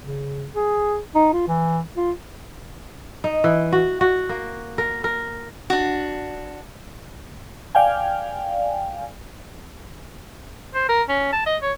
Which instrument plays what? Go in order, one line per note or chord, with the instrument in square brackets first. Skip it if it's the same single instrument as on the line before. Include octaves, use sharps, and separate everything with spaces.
[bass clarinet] C#3
G#4
D#4
F4
E3
F4
[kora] D#4
E3
F#4
F#4
A#3
A#4
A#4
[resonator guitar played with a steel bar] D4 F#4
[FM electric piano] D5 F5 G5 G#5
[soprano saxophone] C5
A#4
C#4
A5
D#5
C#5